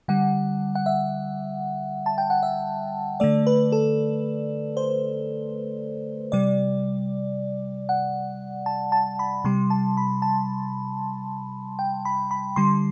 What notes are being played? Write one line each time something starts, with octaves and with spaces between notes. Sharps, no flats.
D3 G3 F#5
F#5
E5
A5
G5
F#5
E5
D3 A3 D5
B4
A4
C5
C3 G3 D5
F#5
A5
A5
B5
C3 G3 C6
A5
B5
A5
G5
B5
B5
D3 G3 C6